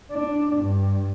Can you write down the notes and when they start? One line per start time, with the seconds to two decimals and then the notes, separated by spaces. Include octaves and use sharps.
0.11 D4
0.56 G2